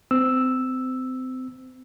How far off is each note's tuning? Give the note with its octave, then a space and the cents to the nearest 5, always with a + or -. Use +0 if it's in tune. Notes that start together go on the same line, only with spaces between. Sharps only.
C4 -30 E6 +0